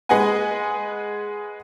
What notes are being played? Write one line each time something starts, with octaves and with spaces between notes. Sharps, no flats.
G#3 G#4 B4 D#5 F#5 G#5